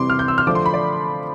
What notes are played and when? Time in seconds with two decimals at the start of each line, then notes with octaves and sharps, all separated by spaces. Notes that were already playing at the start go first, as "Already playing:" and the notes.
Already playing: C3 E3 G3 C4 C6 D6
0.10 F6
0.19 G6
0.28 E6
0.38 F6
0.47 D3 F3 A3 D4 D6
0.55 C6
0.66 B5
0.74 D5